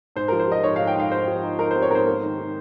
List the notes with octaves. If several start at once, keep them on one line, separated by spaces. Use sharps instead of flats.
G#2 C5
A#4
F3
C5
F3 D#5
G#2 C#5
G#2 F5
G5
G#2 F5
G#2 C5
F3
D#4
D#4 A#4
C5
C4
C#5
G#2 A#4 C5
A#3
D#3
D#3